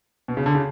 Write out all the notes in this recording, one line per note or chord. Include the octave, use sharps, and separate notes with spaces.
B2
C#3
D3
C#3